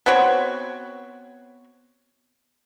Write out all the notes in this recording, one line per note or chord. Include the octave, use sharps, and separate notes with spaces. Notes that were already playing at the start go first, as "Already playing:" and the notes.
B3 C4 F#4 C#5